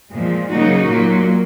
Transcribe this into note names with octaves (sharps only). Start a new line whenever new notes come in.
A#2 F3 G#3
C#3 F#3 A#3 D#4 F#4
A#2 F#3 A#3